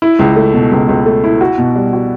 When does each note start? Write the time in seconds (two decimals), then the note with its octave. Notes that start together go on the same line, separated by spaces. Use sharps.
0.02 E4
0.19 C#2
0.36 A3
0.54 B2
0.72 C#2
0.89 C#2
1.06 A3
1.24 E4
1.41 F#4
1.58 B2
1.75 G3
1.93 F#4